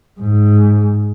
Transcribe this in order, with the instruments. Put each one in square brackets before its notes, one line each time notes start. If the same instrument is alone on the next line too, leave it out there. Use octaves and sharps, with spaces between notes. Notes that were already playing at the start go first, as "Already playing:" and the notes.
[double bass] G#2